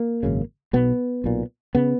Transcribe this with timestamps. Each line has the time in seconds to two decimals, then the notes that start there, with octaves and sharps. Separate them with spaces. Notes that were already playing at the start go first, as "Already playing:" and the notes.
Already playing: A#3
0.23 G#1 F#2 C#3
0.73 B1 B2 B3
1.24 B1 A#2
1.75 C#3 B3